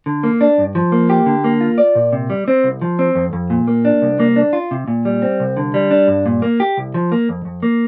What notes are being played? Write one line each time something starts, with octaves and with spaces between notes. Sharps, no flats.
D3
A#3
D4
G2
F3
A#3
G4
D3
A#3
F4
D5
A#2
C3
G3
C4
C2
F3
C4
F2
F2
A#2
A#3
D4
C2
A#3
D4
F4
C3
A#2
G3
C4
C2
D3
G3
D4
G2
A#2
A#3
G4
C2
F3
A#3
F2
F2
A#3